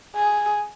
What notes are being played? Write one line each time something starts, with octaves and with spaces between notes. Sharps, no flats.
G#4